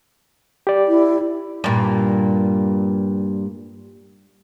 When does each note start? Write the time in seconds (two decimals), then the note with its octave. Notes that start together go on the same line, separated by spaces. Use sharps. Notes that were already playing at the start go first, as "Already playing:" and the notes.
0.67 G4 D5
0.88 E4
1.64 G2 A#2